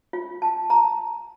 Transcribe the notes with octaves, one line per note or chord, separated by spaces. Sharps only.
F4
A5
A#5